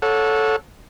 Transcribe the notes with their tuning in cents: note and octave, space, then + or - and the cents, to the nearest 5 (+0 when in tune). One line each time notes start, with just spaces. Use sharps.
A4 -5 C#5 +0 F#5 -30